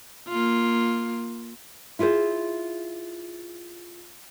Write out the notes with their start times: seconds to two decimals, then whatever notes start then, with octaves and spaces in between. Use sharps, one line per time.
0.28 A#3 F4
1.99 E4 F4 G#4 A4 C5